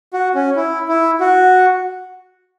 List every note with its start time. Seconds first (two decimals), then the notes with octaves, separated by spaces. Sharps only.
0.13 F#4
0.35 C#4
0.56 E4
0.88 E4
1.20 F#4